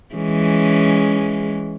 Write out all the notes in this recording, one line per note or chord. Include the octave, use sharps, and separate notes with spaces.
E3 G#3 C#4